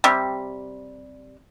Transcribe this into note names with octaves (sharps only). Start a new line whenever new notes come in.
C3 G3